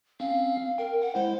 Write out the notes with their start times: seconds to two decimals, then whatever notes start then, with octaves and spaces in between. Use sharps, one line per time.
0.20 C4 C#4 F5
0.78 A#4 G5
1.01 F#5
1.15 G#3 E4 C5